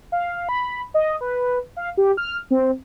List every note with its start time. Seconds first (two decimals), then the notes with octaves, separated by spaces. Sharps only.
0.12 F5
0.49 B5
0.94 D#5
1.21 B4
1.77 F5
1.97 G4
2.17 F6
2.51 C4